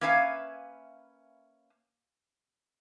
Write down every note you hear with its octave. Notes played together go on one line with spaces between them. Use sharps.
A#3 C#4 B4 E5 F5 G#5